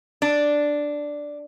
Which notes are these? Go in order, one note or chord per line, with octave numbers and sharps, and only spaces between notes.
D4